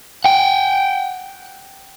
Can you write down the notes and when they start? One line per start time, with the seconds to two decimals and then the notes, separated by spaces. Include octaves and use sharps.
0.25 F#5 G5